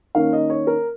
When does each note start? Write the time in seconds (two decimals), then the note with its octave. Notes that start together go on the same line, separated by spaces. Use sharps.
0.15 D#3 A#3 C#4 F5
0.33 D#5
0.50 C#5
0.67 A#4